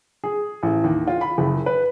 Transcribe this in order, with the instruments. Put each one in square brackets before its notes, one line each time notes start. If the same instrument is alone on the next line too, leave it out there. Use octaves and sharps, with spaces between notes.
[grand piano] G#4
A1
D#2
F4
B5
F#1
B4